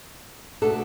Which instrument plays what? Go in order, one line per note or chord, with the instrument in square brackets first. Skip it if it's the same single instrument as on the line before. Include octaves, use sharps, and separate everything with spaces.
[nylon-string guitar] B2 A3 D4 A4